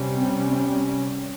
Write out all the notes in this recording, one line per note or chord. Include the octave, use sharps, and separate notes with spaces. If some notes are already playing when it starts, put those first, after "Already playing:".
Already playing: C3 G3 C#4
C4
C4